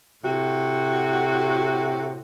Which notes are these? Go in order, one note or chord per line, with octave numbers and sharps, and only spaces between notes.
A2 C3 F#4